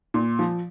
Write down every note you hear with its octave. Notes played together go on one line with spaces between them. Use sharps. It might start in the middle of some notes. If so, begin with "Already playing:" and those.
A#2
F3